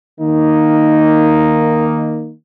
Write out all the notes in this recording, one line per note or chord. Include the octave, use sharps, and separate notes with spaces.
D#3 A#3 D#4